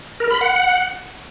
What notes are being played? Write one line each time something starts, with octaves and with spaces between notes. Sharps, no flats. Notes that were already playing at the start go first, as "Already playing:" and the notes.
A#4
B5
F#5